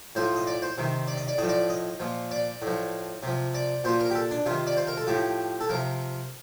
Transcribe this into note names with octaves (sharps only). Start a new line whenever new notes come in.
A2 F3 C5
D#5
D5
C5
C3 D#3
D5
D#5
D5
A2 F3 D#5
D5
D#5
A#2 F3
D5
A2 F3
C3 F3
D5
A#2 F3 C5
A#4
G4
A4
D4
C3 D#3 F4
D5
C5
A#4
A4
A2 F3 G4
A4
C3 F3 A#4